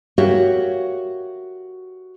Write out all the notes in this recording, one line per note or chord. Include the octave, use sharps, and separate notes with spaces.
F#4 G4 A#4 C#5 E5 F5